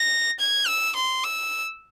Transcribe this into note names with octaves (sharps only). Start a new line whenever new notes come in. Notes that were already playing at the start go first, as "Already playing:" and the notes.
Already playing: A#6
G#6
E6
C6
E6